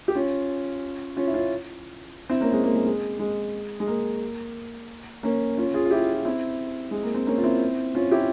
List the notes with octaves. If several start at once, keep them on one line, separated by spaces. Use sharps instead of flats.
G4
C#4 F4
C#4 F4
E4
C#4 F4
C4 E4
A#3 C#4
G#3 C4
A#3
G#3
G#3
G#3
G#3
A#3
A#3 C#4
C#4 F4
F4 G#4
F4
E4 G4
F4
C4 E4
G#3
A#3
C4
A#3 C#4
F4
C4 E4
C#4 F4
E4 G4